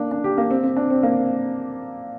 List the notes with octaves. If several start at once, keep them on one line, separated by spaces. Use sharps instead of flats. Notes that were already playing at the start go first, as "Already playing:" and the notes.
Already playing: A#3 D4
D4
G4
A#3
C4
C4
D4
C4
A#3